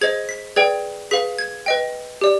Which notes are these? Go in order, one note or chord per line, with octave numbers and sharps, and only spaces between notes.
G#4 C5 D#5 G#6
B6
G#4 B4 D5 G5 G#6
G#4 B4 F5 B6
G#6
B4 D#5 G5
G4 D5